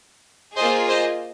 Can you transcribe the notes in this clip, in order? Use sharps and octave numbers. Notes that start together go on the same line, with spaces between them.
A#3 F4 G#4 C5 D#5
C5 D#5